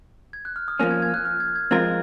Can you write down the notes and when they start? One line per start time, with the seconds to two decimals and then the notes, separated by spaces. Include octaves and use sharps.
0.33 G#6
0.45 F#6
0.56 F6
0.68 D#6
0.79 F3 A#3 C#4 F6
0.91 G#6
1.02 G#6
1.09 F6
1.14 F#6
1.25 F6
1.40 G#6
1.55 G#6
1.71 F3 G#3 C4 F4 A#4 G#6